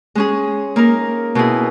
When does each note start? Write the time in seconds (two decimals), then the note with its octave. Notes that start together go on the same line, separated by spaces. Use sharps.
0.15 G#3 C#4 G#4
0.76 A#3 D#4 A#4
1.35 B2 A#3 E4 G#4